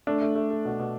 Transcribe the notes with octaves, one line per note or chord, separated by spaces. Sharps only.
A3 D4
A3
A3
A3
B2
B2